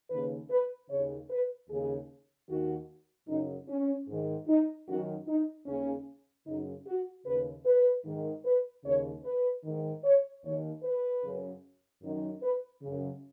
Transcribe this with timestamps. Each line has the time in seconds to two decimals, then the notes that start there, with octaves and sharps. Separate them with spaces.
0.10 D#2 C#3 B4
0.50 B4
0.89 C#3 C#5
0.94 D#2
1.30 B4
1.69 D#2 C#3 G#4
2.49 D#2 D#3 F#4
3.28 F#2 C#3 D#4
3.68 C#4
4.08 G#2 D#3
4.47 D#4
4.87 F#2 D#3 F#4
5.27 D#4
5.66 D#2 C#3 C#4
6.46 F#2 C#3 D#4
6.86 F#4
7.26 D#2 C#3 B4
7.65 B4
8.04 G#2 D#3
8.45 B4
8.84 D#2 C#3 C#5
9.24 B4
9.64 G#2 D#3
10.04 C#5
10.43 D#2 D#3 C#5
10.83 B4
11.23 F#2 C#3
12.02 F#2 D#3
12.42 B4
12.81 C#3
12.87 F#2